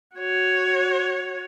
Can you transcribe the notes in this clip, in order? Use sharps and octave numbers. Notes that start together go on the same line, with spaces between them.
F#4 C#5